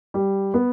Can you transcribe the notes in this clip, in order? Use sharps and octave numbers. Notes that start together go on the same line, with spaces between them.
G3
B3